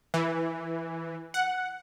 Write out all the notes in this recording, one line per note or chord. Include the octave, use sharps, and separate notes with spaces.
E3
F#5